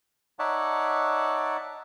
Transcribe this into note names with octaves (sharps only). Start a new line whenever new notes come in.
D#4 C#5 D5 E5 F#5 A5